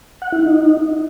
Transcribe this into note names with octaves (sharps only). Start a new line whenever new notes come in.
F#5
E4
D#4